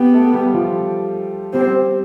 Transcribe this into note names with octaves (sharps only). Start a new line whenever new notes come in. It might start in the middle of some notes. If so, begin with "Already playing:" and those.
Already playing: B3 G4 G5
A3 A4
G3 G4
F3 F4
G3 C4 G4